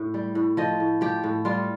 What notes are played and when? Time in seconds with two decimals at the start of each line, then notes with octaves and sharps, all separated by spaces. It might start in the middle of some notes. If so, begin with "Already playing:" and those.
Already playing: A2
0.14 G3
0.35 A2
0.57 F3 D#5
0.80 A2
1.01 F3 G4
1.24 A2
1.45 G3 F4